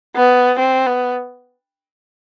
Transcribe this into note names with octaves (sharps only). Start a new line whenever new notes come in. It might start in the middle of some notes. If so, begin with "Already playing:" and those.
B3
C4
B3